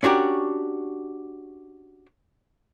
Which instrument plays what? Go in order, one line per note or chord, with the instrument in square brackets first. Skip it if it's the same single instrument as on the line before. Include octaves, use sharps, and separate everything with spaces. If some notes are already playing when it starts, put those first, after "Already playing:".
[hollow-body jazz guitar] C#4 D4 F#4 G4 A#4